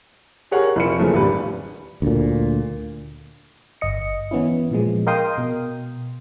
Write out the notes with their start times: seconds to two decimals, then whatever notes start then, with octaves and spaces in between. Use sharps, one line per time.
0.51 G4 G#4 A#4 C#5 F#5
0.76 F1 F3 C#7
0.97 C#3 E3 F3 A3 A#3
1.14 G#1 D#2 G3 D4 B4
2.02 D2 A#2
3.81 G1 D#5 C#7
4.31 E3 B3 C#4 E4
4.71 A#2 F3 G#3
5.07 A#4 D#5 F5 G5 C6 D#6
5.38 B2